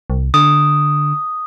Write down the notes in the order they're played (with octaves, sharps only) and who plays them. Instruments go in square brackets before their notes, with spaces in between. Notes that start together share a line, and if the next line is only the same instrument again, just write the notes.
[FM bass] C2
[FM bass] D3 [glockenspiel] D#6